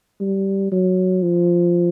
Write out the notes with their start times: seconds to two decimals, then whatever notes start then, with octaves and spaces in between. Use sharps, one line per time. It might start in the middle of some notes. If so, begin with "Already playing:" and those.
0.20 G3
0.72 F#3
1.23 F3